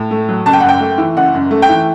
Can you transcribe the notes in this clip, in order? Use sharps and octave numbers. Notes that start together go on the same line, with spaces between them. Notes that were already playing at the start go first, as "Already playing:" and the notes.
Already playing: A2
A3
F#3
F#1 A5
G5
F#5
F#2 G5
A3
E3
F#1 F#5
F#2
A3
G5
E3